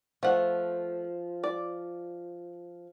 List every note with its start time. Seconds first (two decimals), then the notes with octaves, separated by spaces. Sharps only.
0.23 F3 A3 F#5
1.44 D5